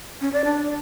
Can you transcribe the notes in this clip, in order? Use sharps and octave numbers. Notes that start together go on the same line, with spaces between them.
C#4
D5
D4